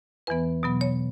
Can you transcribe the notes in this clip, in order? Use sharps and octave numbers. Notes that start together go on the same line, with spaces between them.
E2 E3 B3 B4
B2 F#3 B3
C#5